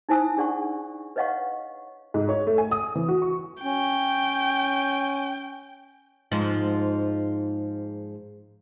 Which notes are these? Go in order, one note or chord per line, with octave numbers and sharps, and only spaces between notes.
D#4 E4 C5 G#5 D#6 E6
D4 G#4 D5 F#5 C#6
B4 C#5 D#5 F5 F#5 C#6
G#2
C#5
A3
G#5
D#6
E3
F#4
C#6
C#4 G5
G#2 F3